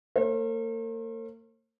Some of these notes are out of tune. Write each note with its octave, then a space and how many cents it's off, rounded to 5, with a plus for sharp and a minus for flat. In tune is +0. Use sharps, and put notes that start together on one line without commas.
A#3 -40 C5 +45